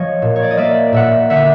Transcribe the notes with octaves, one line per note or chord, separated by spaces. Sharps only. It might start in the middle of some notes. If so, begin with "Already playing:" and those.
Already playing: F3 C#5 D#5
A#2
C#5
D5
D#5
A#3 D5 E5
A#2 E5 F#5
D3 E5 F#5